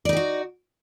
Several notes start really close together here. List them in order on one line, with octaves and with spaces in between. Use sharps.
D5 D#4 G4 F#4